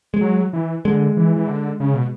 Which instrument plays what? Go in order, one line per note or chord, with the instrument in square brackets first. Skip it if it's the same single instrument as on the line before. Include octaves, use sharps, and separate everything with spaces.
[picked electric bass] G#3
[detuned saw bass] F#3
E3
[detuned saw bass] D3 [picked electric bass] G#3
[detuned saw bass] E3
E3
D3
C#3
B2